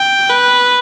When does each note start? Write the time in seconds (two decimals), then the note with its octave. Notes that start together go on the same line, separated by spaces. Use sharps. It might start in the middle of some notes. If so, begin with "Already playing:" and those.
Already playing: G5
0.30 B4